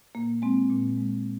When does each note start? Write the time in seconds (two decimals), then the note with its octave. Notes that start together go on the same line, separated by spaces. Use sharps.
0.15 A#2 A#3
0.42 G#3 C4
0.70 A#2
0.97 G#3